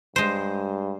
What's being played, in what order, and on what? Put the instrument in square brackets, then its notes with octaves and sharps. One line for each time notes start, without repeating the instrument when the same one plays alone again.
[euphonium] G2 [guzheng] G#3 C5